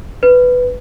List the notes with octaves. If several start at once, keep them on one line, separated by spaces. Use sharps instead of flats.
B4